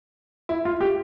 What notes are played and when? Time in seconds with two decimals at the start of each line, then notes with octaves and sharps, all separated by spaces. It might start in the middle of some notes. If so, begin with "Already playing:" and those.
0.49 E4
0.65 F4
0.81 G4